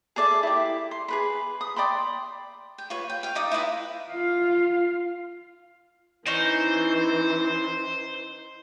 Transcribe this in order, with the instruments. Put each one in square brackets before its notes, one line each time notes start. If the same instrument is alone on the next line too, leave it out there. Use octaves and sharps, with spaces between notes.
[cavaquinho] G#4 A4 D5 E5
E4 G4
C6
G#4 B4 B5
D#6
D5 G5 B5 C6
G5
F4 B4 C#5
G5
F5 G5
D#4 D5 D#6
E4 F4 B4 D#5
[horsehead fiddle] F4 F5
[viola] E3 [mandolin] C#4 D#4 [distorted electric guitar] C5